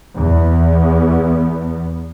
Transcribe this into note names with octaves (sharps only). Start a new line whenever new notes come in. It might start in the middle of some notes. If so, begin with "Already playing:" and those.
E2 B3